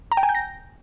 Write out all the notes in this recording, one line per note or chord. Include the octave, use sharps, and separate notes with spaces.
A#5
G5
G#5
G6
A#6